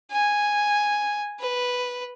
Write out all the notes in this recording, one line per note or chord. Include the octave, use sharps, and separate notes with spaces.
G#5
B4